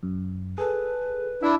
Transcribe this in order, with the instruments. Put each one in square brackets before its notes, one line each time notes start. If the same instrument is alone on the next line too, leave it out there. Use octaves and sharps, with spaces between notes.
[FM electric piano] F#2
[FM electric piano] G#4 A4 [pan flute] B4
[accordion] D4 E4 [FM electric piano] E5